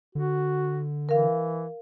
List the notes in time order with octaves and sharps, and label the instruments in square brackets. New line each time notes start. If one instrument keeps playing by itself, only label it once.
[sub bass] D3 [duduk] F#4
[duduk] E3 [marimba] A#4 F5